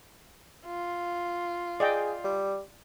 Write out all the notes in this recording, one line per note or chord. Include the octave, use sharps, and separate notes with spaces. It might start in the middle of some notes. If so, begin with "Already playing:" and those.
F4
G#4 D5 D#5 G5
G3